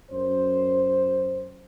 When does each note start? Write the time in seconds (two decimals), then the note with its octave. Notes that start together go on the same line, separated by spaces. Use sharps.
0.11 F#2 C5